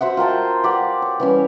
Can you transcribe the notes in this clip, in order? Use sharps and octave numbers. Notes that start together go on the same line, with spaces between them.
F#4 C5 E5 F#5
F4 A#4 G5 A5
G4 D5 F#5
C#5
E3 G3 C#4